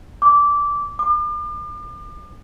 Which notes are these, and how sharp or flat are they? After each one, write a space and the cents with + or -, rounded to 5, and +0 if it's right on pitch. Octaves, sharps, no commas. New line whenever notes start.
D6 -15
D6 +40